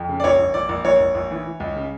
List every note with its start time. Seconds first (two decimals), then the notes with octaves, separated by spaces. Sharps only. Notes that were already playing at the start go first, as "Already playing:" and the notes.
Already playing: F2
0.09 C#3
0.20 D5
0.24 A#1 C#5
0.39 A#1
0.54 A#1 D5
0.69 A#1
0.85 A#1 C#5
1.00 A#1
1.15 A#1
1.31 E3
1.46 E3
1.60 C#2
1.76 C#3